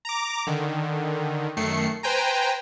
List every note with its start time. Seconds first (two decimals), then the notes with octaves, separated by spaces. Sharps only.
0.05 A#5 D6
0.47 D3 D#3
1.57 F#2 D#3 A3 C7 C#7
2.03 B4 C5 G5 G#5 A#5